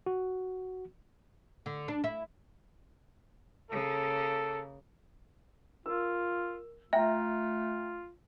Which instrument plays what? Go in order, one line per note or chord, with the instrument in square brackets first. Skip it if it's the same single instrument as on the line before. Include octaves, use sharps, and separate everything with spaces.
[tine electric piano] F#4
[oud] D3
D4
E4
[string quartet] C#3 A#3 [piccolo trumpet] A4
[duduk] F4 [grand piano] A#4 E6
[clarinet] A3 [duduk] F4 [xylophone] E5 [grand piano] G5 A#5